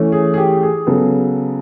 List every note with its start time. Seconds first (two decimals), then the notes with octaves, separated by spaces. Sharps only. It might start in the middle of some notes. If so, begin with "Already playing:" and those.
Already playing: E3 A3 C#4
0.12 G#4
0.34 G#4
0.38 G4
0.63 G#4
0.87 C#3 F#3 B3 A4